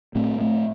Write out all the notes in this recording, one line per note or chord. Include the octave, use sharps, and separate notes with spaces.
A2 A3 C4
A3 C4